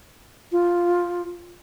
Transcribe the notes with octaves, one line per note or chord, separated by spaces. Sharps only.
F4